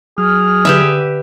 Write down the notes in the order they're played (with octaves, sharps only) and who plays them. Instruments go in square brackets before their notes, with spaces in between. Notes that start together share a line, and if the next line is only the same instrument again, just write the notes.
[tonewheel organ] F#3 F6 [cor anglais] G#4
[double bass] D3 [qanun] G4 B4 E5